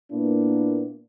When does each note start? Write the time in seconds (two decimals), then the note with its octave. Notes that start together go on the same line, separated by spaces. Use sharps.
0.13 A#2 A#3 B3 D4 E4